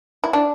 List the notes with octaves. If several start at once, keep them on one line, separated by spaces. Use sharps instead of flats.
E4
D4